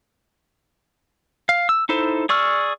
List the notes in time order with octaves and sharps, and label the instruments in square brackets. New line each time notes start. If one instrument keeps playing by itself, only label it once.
[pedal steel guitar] F5
E6
D#4 E4 A4 C5
G#4 D5 C#6 E6 F6